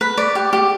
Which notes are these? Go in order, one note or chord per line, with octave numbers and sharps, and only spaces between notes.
B4
D5
G4
G4